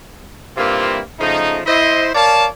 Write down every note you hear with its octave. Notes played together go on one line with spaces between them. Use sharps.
G2 C3 A#3 C4 E4 F4
C#3 F3 A3 D#4
E4 C5 D#5
A#4 C#5 D5 F5 A5